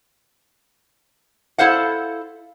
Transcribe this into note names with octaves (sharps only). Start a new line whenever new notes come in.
E4 A4 C5 F5 F#5